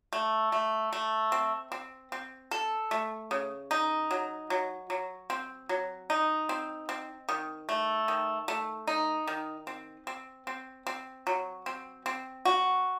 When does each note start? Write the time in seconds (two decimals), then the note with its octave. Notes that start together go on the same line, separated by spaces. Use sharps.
0.13 A3
0.52 A3
0.93 A3
1.32 C4
1.72 C4
2.12 C4
2.51 A4
2.91 A3
3.31 C#3
3.71 D#4
4.11 F#3
4.50 F#3
4.90 F#3
5.30 C4
5.69 F#3
6.10 D#4
6.49 C4
6.89 C4
7.29 D#3
7.69 A3
8.08 D#3
8.48 A3
8.87 D#4
9.27 D#3
9.67 C4
10.07 C4
10.47 C4
10.87 C4
11.27 F#3
11.66 C4
12.06 C4
12.45 F#4